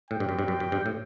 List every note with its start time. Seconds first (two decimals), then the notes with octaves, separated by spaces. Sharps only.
0.11 A2 G5
0.20 G2
0.29 F#2
0.39 G2
0.48 F#2
0.60 F#2
0.72 G2
0.86 A2